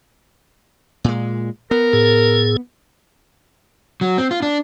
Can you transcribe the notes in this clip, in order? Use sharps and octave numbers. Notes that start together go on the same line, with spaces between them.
A#2 G#3
B3 A#4
A2 G#4
F#3
C4
F4
D4